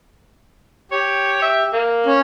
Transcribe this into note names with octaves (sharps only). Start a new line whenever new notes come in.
G4 C#5
E5
A#3
C#4